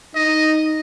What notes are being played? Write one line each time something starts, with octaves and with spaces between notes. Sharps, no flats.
D#4 D#5